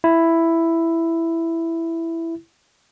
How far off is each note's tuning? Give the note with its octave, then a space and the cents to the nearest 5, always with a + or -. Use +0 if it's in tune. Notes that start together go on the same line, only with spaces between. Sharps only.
E4 +5